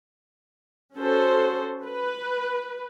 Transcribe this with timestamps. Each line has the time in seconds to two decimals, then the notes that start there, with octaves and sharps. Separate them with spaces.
0.96 C#4 F#4 A4 C5
1.85 B4